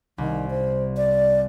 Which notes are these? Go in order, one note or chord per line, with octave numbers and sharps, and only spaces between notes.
C2 D#3
C5
D5